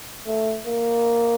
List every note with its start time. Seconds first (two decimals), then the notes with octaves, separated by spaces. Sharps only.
0.27 A3
0.66 A#3